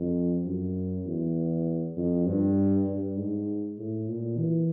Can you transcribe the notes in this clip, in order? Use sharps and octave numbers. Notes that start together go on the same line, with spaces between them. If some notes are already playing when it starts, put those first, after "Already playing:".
Already playing: F2
F#2
E2
F2
G2
G2
G#2
A2
A#2
E3